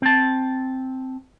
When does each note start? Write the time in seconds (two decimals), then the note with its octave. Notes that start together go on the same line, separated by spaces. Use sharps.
0.02 C4 A5